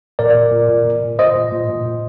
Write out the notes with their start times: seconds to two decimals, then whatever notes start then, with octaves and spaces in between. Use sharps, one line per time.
0.19 A#2 A#4 D5
0.35 A#2
0.52 A#2
0.70 A#2
0.85 A#2
1.03 A#2
1.19 A#2 C5 D#5
1.36 A#2
1.53 A#2
1.70 A#2
1.86 A#2